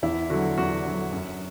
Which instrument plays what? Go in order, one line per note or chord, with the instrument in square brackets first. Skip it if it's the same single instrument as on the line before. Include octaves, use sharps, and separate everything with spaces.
[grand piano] E2 E4
D3 F#3 F#4
E2 F#4
D3 F#3
F#2